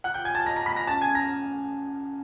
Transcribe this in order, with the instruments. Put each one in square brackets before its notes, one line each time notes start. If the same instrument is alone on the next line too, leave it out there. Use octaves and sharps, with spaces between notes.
[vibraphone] F4 [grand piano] F#5 F#6
[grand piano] G5 G6
[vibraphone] F#5 [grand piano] G#5 G#6
[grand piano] A5 A6
[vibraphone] D#5 [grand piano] A#5 A#6
[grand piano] A#5 A#6
[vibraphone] F#5 [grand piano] B5 B6
[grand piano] A#5 A#6
[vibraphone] C#4 [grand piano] A5 A6
[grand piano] G#5 G#6
[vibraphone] C#4
[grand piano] A#5 A#6